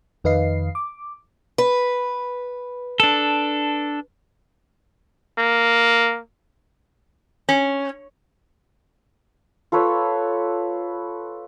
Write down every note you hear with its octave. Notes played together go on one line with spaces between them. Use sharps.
F2 D#3 B4 D#5 F5 C7
D6
B4
D4 A4
A#3
C#4
F4 A4 B4 C#5